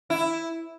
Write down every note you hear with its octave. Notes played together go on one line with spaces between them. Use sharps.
E4